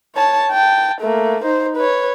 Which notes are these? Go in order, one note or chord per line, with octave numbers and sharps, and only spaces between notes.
C#5 A5
G5 A5
A3 A#3
D#4 C5
B4 C#5